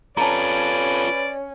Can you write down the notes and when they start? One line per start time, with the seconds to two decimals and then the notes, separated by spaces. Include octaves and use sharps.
0.17 C#4 F4 A4 B4 D5 A5 A#5